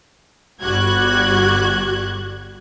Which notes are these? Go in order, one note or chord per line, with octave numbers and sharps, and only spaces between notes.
G1 G3 F#4 F#6 G#6